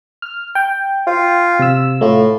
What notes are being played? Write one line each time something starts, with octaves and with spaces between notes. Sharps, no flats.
F6
G5
F4
C3 E6
A2 A3 F4